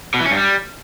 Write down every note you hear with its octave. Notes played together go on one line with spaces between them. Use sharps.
B2
E3
C#4
G2
G3